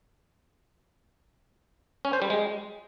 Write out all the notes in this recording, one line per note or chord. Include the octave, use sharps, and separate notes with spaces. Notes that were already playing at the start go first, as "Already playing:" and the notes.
C#4
C5
G3
G#3